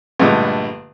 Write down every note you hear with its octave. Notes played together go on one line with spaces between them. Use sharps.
A#1 G2 D3 G#3 A3